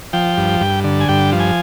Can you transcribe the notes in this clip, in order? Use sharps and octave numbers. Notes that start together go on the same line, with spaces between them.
F3 G5
G2
G2
D3
G#5
G2 G5
F3
G#5